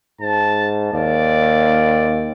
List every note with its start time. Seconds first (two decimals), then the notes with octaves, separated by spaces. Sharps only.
0.21 G#2 A5
0.93 D#2 D5